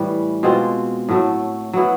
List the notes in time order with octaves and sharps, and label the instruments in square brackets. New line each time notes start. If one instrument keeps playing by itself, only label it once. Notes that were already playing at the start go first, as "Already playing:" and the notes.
Already playing: [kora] A2 E3 G3
B2 G#3 C4 F4
A2 F#3 A3
F#3 B3 E4